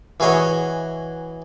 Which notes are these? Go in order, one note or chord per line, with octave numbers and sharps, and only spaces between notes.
E3 F#4 G#4 C#5 D#5